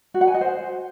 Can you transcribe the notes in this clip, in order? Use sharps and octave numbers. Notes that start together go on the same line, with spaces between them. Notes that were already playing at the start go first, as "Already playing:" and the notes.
F#4
F#5
G#5
D#5
C5